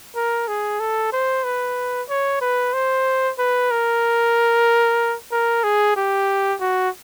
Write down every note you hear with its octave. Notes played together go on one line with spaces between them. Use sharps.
A#4
G#4
A4
C5
B4
C#5
B4
C5
B4
A#4
A#4
G#4
G4
F#4